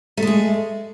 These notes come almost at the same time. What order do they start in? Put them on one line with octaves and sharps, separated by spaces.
A3 G#3 G#4